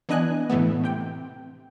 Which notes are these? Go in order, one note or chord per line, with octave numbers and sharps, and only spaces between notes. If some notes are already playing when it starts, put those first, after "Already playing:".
E3 B3 D4 D#5 G#5 F#6
A2 E3 A3 B3
C3 G5